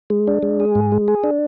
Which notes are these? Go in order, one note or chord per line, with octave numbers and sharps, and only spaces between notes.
G#3
D4
G#3
G#4
G#2
G#3
G#4
D4